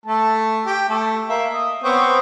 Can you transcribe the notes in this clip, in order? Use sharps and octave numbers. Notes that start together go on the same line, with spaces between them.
A3 A5
G4
A3
A#3 E5
D#5
B3 C4 C#5